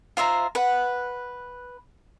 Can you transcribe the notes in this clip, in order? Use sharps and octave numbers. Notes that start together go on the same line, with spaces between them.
F4 C5 E5 A#5
B4 F#5